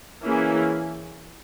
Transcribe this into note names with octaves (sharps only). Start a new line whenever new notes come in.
E3 A#3 C#4 E4 G#4